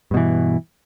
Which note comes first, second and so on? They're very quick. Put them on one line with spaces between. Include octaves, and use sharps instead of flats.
G2 B2 E3